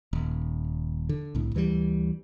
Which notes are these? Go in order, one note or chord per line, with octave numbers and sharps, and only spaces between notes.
D#1
D3
C2 A2
D2 E3 F#3 G3